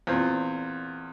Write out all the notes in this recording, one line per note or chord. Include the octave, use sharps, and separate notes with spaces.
E2 A#2 C4